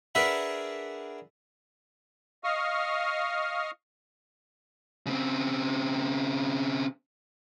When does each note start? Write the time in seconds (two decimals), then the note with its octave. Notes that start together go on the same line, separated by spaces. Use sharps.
0.15 D4 G#4 A#4 B4 E5 F#5
2.44 D#5 F5 C#6 D#6 F6
5.06 C#3 C4